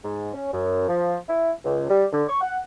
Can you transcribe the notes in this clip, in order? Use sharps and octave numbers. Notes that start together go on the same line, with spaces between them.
G#2
C#4
F#2
F3
E4
C#2
G3
D3
C#6
F#5